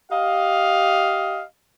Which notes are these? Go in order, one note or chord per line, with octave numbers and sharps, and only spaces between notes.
G4 D#5 F5